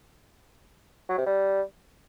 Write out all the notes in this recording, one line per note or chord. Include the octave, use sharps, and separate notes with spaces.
F#3
C3
G3